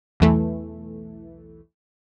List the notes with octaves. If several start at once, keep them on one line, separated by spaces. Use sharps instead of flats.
B1 E2 E3 A3